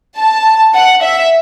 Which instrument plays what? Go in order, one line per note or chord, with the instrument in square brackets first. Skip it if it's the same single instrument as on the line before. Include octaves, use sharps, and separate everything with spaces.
[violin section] A5
F#5
E5